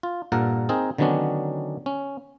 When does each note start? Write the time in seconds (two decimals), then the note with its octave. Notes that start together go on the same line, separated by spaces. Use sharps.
0.03 F4
0.32 G2 A#2 A4 A#4 F#5
0.69 C4 D#4 G#4 A#4
0.98 D3 D#3 F#3 B3 C#4 D4
1.86 C#4